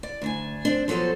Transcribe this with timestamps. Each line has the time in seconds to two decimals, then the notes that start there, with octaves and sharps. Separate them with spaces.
0.03 D5
0.22 D2 D4 G#5
0.65 C4 D4
0.88 F3 F#3 B3 A4 C5